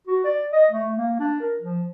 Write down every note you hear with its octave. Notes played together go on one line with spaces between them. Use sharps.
F#4
D5
D#5
A3
A#3
D4
A#4
F3